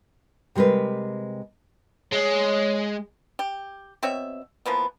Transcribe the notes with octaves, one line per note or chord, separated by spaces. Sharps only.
C3 G3 G#3 A#4 B4
G#3 C#5
G4
B2 C4 C#5 E5
E3 F3 A#3 B3